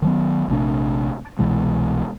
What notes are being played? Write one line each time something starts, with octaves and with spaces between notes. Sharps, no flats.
D#3 F#3 B3
A#1 C3 A3 D4
C2 B2 E3 G#3